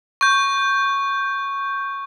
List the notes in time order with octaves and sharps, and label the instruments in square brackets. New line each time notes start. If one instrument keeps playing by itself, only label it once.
[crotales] C#6 G6